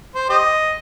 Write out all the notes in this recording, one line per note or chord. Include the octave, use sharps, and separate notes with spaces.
C5
G4 C5 D#5